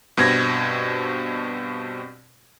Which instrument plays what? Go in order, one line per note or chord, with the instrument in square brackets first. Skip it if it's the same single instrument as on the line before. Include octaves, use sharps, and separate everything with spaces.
[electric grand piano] G2 B2 C4 G#6 A#6